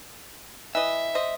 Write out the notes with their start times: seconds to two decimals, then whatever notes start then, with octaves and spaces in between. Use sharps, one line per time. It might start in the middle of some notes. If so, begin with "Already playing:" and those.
0.75 E3 D#5 E5
1.15 C5 D#5